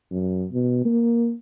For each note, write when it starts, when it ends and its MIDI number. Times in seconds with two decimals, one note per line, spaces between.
0.12 0.46 42
0.53 0.85 47
0.85 1.33 58